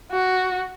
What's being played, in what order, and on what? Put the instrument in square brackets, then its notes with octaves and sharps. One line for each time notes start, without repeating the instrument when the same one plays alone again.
[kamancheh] F#4